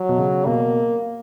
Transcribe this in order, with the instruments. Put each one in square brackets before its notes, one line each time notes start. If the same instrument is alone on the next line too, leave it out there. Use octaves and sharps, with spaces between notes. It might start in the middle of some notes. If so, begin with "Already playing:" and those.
Already playing: [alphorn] F#3
[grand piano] B2
C#3
[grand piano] B2 [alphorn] A#3